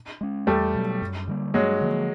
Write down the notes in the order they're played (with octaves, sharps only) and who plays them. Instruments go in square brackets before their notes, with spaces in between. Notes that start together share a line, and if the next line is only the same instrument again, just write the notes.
[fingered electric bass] G#3 C#4
[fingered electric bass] E2 [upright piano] G3 A3
[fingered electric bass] B2 F#3
F#2
D3 G3 A#3
[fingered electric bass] G2 [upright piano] F#3 G#3
[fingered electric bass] D3 F3 A#3